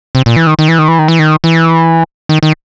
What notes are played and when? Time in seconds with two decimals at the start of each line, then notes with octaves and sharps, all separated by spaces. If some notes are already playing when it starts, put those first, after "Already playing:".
0.15 C3
0.26 A#2
0.36 E3
0.47 D#3
0.59 D#3
0.68 E3
0.79 D#3
0.88 E3
0.99 D#3
1.08 E3
1.19 D#3
1.44 E3
2.29 D#3
2.43 D#3